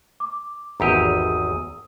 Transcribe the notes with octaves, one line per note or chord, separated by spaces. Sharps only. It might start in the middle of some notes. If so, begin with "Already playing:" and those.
D6
G#1 E2 G4 A#5 D#6 E6 D#7